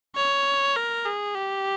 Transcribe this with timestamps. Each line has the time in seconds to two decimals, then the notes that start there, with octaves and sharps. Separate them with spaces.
0.16 C#5
0.76 A#4
1.05 G#4
1.35 G4